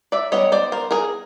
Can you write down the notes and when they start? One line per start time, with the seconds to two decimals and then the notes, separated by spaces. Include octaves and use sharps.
0.12 D5 E5
0.32 G3 B3 D#4 C#5 D#5
0.52 C5 D5
0.72 A#4 C5
0.91 G#4 A#4